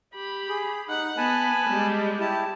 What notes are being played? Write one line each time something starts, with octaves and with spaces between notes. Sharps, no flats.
G4 B5
G#4
D#4 F#5
B3 G#5 A5 B5
G3 G#3
E4 G4 A5